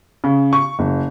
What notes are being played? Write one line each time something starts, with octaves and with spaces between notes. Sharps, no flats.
C#3
C#6
F#1